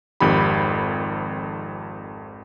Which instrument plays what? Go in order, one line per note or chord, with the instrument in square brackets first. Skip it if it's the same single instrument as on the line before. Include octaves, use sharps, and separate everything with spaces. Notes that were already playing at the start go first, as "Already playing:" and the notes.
[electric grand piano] G#1 F2 D#3 G4 B5